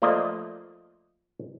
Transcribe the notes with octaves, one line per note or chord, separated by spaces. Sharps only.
F3 A3 A#3 C5 D5 D#5